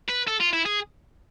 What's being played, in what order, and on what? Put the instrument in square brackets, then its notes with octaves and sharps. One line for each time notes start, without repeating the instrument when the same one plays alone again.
[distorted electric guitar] B4
A4
F4
E4
G#4